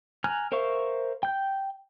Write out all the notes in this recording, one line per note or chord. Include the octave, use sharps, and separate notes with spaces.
G#5 A#5 F6 F#6
A#4 C5 E5 F5 C#6
G5 G6